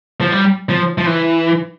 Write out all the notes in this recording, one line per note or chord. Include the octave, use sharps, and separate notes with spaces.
F3
G3
F3
F3
E3